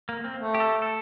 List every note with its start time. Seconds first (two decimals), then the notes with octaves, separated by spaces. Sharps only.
0.09 A#3
0.24 C4
0.39 A3
0.54 G4
0.60 A4
0.82 A4